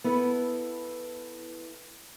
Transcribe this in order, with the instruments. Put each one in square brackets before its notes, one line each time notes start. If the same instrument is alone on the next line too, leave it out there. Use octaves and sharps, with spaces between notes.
[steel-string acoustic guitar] B3 E4 A4 B4